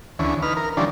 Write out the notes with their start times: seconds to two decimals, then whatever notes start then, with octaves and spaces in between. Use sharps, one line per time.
0.19 D2 E3 C#4
0.42 D#4 B4 F6
0.57 A#4
0.77 D3 E3 F3 G3 C#4 D4